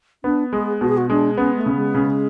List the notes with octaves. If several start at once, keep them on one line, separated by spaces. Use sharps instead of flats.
B3 D4
G#3 G#4
B2 F#4
G#4
F#4
G#3 D4
B3 C#4
A3
C#3
G#3
C#3